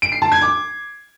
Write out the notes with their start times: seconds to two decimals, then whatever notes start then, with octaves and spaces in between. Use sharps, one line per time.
0.02 D7
0.12 C7
0.22 A5
0.32 G#6
0.41 D6